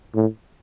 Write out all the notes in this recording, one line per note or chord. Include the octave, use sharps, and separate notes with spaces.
A2